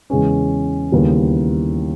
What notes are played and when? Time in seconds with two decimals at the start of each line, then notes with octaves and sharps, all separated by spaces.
0.10 E2 C#3 G#3 C#4
0.92 D#2 C#3 E3 G3 B3